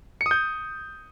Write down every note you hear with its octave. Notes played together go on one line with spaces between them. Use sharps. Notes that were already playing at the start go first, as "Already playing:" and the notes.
C#7
D#6
G6